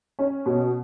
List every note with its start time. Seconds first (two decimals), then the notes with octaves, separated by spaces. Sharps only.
0.19 C#4
0.46 B2